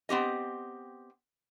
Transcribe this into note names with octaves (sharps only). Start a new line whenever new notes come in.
B3 C4 G4 D#5